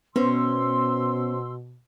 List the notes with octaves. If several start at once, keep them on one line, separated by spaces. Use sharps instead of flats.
B2 B3 C#4 C5 C6 E6